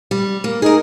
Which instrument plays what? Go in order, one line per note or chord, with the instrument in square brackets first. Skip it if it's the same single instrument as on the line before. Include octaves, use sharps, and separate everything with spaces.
[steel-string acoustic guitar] G3
A#3
[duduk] D#4 [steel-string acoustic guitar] G#4 A#4